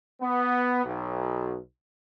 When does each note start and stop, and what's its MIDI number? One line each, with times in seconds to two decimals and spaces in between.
0.20 0.81 59
0.84 1.57 35